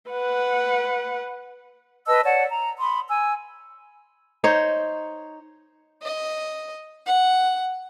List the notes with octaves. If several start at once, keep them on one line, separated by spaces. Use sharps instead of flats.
B4 F#5
B4 D#5 A5 E6
C#5 D5 F#5 A5
A#5
B5 C6 D#6
G#5 E6
D#4 C5 C#5
D#5
F#5